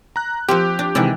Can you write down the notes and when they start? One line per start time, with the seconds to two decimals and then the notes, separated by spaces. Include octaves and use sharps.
0.16 A#5 F#6
0.49 F3 A#3 C4 G4
0.79 D4
0.95 C3 D#3 E3 G#3 D5